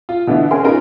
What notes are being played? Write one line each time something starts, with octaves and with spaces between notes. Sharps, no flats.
F4
B2 D3 E3 E4
C#4 G#4 A#4 C6
C#4 D#4 F4 A#4 B4